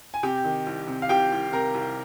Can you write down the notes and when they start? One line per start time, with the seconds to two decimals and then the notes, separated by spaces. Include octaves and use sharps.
0.14 G#5
0.23 C3 G4 G5
0.44 D#3
0.67 C2
0.88 C3
1.02 F5
1.09 C2 G4 G5
1.32 C2
1.53 C3 A#4 A#5
1.74 C2